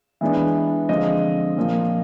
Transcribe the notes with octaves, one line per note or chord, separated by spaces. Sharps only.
E3 G#3 B3 D4
D3 F3 G#3 C4 D#5
A#2 F3 A#3